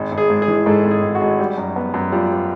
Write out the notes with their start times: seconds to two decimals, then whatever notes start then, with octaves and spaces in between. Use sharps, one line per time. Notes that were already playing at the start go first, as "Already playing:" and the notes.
Already playing: G#1
0.12 G#1
0.18 G#4
0.30 G#2
0.42 G#4
0.48 E3
0.66 G#2 A4
0.85 G#1
0.91 G#4
1.03 G#1
1.15 F#4
1.21 G#1
1.40 G3
1.58 F#2
1.76 B3
1.94 F#2
2.12 G3 F4
2.30 G3